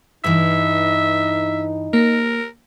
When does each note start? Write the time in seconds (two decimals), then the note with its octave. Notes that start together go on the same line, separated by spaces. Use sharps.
0.24 G2 E3 D#4 E5
1.93 A#3 A#4